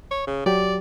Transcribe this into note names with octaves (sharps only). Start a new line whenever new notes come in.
C#5
C#3
F#3 G4 D5